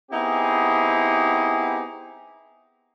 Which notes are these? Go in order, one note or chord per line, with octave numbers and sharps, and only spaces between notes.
B3 C4 D#4 E4 G4 G#4